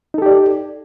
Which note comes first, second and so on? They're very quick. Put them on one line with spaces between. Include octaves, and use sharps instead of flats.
D#4 A4 G4 D5